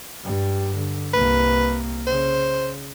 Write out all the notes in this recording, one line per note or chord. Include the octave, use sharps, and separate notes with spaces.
G2 G3
D3
C2 A#3 B4
C#3 C5